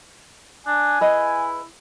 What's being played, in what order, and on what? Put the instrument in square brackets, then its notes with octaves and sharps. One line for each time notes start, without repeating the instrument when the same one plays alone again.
[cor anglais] D4 [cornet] G#5
[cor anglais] E4 [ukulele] G#4 B4 D#5